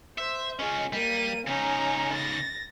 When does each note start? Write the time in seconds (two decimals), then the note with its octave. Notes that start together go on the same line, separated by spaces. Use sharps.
0.18 C5 E5
0.59 C#4 F4 G#4 D#5
0.93 G3 A#3 D#7
1.47 C#3 C#4 D#4 A#5
2.13 A6 A#6